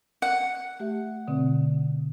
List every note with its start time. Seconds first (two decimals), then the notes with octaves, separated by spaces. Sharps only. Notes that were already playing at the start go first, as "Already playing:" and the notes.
0.22 F#5
0.80 A3 G4 E5
1.28 B2 D3 C4